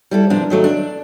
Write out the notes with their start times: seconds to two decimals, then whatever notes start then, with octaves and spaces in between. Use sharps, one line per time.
0.11 G3 E4 A4
0.30 C3 F3 A#3 D4
0.50 D#3 F#3 A3
0.64 D4